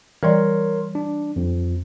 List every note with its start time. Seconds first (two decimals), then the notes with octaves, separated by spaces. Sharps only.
0.23 E3 G3 A#4 C#5 D5 C6
0.95 D4
1.36 F2